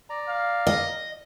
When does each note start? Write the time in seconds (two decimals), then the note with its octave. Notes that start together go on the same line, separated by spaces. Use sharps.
0.10 D5 A#5
0.28 F5
0.67 D#5